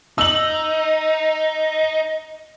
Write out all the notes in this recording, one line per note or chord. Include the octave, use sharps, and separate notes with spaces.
D#4 E6 F#7